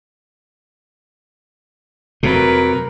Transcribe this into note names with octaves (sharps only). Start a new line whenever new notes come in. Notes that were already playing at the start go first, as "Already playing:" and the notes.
F2 C3 F#3 A3 A#4 B4